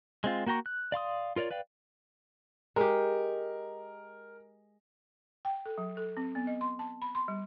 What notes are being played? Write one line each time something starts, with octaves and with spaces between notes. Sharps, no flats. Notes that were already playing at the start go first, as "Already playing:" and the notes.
G#3 C4 F4
A#3 F#4 G5 A#5 C#6
F#6
D5 F5 C6 D#6
F4 A#4 C#5 D5
B4 D5 F5 G5
G#3 G4 A#4
G5
A4
F#3
A4
C4
B3
D#5
C6
A5
B5
C6
G3